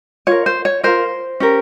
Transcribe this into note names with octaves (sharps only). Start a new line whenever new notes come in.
F4 A#4 C#5
C5
C#5
F4 A#4 C5
C#4 G4 A#4